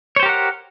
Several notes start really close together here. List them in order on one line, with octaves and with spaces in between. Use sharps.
C#5 C5 G4 A#4 F#5